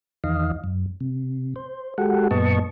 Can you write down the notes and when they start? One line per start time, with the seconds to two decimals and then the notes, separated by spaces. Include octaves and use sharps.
0.24 E2 D#3 D#5 F5
0.64 F#2
1.00 C3
1.56 C5
1.98 G#3 F#4 G4 A4 F#5
2.31 F#2 A#2 B3 D#5 A5 C#6